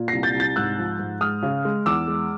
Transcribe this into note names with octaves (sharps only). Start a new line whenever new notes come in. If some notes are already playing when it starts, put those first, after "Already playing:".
Already playing: A#2
C2 A#6 C7
G6 A6
C2
G6 A6
G#2 E6 F#6
F3
G#2
G#3 D#6 F6
C#3
G#3
E2 D6 E6
G#3